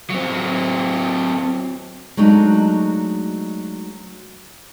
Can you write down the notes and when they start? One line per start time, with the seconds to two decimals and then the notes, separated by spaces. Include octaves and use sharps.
0.10 F#3 C4
2.17 F#3 G#3 A3 D4 D#4